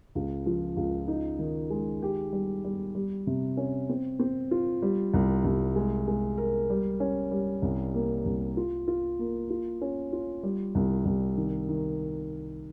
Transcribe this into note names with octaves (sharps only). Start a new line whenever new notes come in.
C#2
F3
C#2
D#4
D#3
G#3
G4
G3
G3
G3
C3
C#4
C4
C4
F4
G3
C2
C2
G#3
G#3
A#4
G3
C#4
G3
C2
A#3
C2
F4
F4
A#3
F4
C#4
F4
G3
C2
C2
D#3
D#3